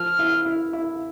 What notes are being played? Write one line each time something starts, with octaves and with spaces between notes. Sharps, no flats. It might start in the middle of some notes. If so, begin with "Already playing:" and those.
Already playing: F3 F6
E4
E4
E4